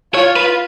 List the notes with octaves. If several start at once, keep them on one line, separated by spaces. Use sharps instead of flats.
F4 C#5
B4